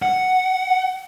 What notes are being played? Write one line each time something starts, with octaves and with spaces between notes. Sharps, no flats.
F#5